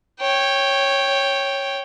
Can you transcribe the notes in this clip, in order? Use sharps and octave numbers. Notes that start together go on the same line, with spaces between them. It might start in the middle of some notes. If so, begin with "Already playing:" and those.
C#5 G5